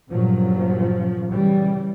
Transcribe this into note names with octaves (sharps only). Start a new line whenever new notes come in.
G2 A#2 C#3 F3 F#3
C#3 E3 G3